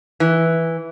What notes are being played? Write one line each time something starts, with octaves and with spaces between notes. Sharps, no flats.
E3